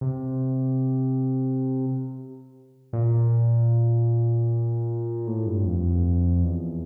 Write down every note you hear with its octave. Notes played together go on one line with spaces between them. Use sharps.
C3
A#2
A2
G2
F2
E2